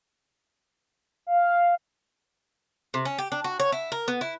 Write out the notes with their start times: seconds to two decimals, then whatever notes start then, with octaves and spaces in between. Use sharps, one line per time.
1.27 F5
2.94 C3
3.05 C#4
3.19 G4
3.32 D4
3.44 F#4
3.60 C#5
3.72 E4
3.92 A#4
4.08 B3
4.21 E4